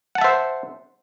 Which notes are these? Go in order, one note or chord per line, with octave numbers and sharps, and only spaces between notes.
C5 E5 F#5 A5